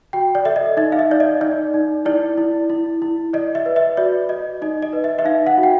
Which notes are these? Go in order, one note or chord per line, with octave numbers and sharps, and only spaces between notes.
F#4 G5
D5
A4 E5
D#5
D#4 E5
F5
E5
D#4 D5
D#5
D#4 D5
D#4
E4 D5
E4
E4
E4
D5 D#5
E5
B4
E5
F#4 D5
D5 D#5
D#4 D#5
D#5
B4
E5
E5
D#4 F5
F#5
F#4
G5